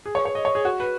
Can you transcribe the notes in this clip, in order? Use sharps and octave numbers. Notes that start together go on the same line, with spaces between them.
G#4
C#5
C#5
D#5
C#5
G#4
F#4
B4